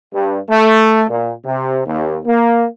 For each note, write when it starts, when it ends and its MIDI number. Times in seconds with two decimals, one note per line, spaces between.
0.14 0.38 43
0.49 1.04 57
1.09 1.30 46
1.44 1.80 48
1.86 2.18 39
2.25 2.66 58